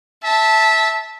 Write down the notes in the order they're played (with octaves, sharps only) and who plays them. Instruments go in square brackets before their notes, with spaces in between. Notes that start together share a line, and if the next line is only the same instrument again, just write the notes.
[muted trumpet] E5 [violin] A5